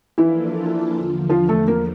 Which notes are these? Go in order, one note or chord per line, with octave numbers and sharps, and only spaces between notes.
E3 F3 A#3 D4 E4 F4 A4
E2 D3 F3
F3 F4
A3 A4
A#3 A#4